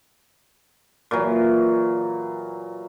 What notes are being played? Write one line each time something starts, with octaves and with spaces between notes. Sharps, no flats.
A#2 E3 F#3